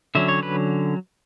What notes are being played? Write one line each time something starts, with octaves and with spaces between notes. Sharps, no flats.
D3 F#3 C#4 E5
C#5
B4